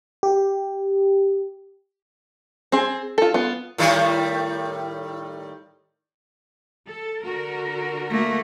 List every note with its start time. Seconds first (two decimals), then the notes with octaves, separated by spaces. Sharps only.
0.23 G4
2.72 C4 G#4
3.18 F4 A4
3.34 B3 F4
3.78 A2 D#3 G3
6.87 A4
7.21 D3 F#4 A#4
8.10 A3 A#3